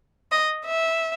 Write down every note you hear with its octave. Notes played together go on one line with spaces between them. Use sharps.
D#5
E5